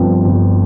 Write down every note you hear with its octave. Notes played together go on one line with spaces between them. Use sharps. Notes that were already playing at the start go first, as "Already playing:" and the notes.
Already playing: G1 G2 F3 C4
G1